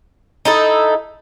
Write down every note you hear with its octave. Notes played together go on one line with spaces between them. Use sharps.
D#4 E4 A4